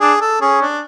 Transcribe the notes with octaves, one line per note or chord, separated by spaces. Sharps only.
D4 G#4
A4
C#4 G#4
D4